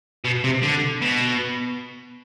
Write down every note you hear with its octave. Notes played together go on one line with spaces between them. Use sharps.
B2
C3
D3
B2